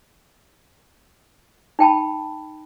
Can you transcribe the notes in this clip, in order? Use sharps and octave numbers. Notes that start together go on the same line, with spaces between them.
D#4 G5 A5 B5